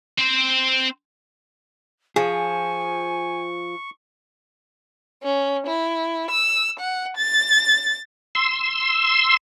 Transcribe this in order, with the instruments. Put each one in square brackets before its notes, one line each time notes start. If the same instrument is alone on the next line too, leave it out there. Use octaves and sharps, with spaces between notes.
[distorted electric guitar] C4 C5
[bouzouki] F3 [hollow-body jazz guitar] G#4 [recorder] G#5 [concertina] C#6
[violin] C#4
E4
E6
F#5
A6
[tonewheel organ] C6 E6